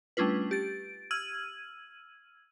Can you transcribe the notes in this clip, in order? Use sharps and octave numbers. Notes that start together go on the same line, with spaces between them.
G3 A3 C#4 D4 F4 B4
G4 A6 D7
E6 F6 G#6 D#7 F#7